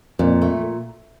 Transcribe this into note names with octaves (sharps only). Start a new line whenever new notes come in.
F2 A#2
A3